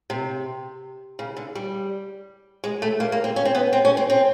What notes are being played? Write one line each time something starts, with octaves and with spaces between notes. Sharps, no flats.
C3
C#3
D3
G3
G#3
A3
A#3
A#3
C4
C#4
C4
B3
C4
C#4
C4
C4